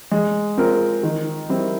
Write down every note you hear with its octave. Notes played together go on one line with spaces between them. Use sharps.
G#3
C4 F4 A#4
D#3
G3 C4 E4